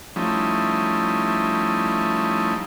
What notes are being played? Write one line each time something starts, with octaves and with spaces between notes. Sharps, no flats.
F3 G3 A3 C#4 D#4 E4